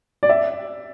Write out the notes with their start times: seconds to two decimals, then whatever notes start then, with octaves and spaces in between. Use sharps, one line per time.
0.23 D5
0.29 E5